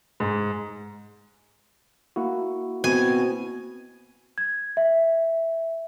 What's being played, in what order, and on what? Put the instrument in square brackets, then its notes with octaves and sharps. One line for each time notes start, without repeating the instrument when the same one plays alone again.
[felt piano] G#2
[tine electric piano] A#3 E4 F#4
[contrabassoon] B2 [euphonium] C4 [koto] G#5
[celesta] G#6
E5